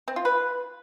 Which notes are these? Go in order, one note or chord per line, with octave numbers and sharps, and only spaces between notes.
C4
F4
B4